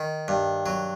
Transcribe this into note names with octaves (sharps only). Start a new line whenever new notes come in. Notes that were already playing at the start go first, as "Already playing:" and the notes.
Already playing: D#3
G2
F#3